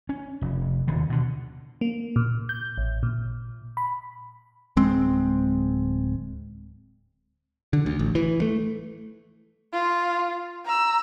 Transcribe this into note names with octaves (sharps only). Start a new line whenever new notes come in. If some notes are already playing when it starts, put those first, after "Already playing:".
C#4
F1
D#1 D#2 D3
B2 D3
A#3
A#2
G6
A1
A#2
B5
D1 G#3 C4
D3
D2
A1
E3
A3
F4
A#5 E6